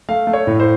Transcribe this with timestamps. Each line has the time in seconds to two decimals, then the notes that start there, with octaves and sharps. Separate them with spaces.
0.09 A3 F5
0.27 A3
0.33 C#5
0.47 A2
0.60 C5